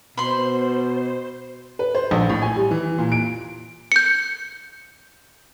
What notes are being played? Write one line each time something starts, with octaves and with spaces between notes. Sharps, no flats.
B2 C5 B5 C6
B4
C5
A#1
A2
G#5
G3
E3
A#2
D7
G6 C#7